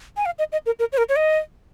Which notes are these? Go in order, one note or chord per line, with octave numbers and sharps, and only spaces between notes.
G#5
F5
D#5
D#5
A#4
A#4
C#5
A#4
C#5
D#5